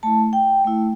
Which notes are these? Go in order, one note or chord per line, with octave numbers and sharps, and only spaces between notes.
A3 E4 A5
G5
A3 E4